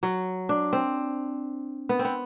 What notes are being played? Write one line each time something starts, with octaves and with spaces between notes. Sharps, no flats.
F#3
D4
C4
B3
C4
B3